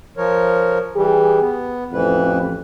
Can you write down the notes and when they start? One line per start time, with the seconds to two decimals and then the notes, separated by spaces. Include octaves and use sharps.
0.17 F3 A#4 C#5
0.96 E3 G3 G4 G#4
1.40 B3
1.93 A1 F2 E3 B4